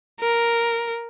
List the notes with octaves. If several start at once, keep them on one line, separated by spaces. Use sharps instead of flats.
A#4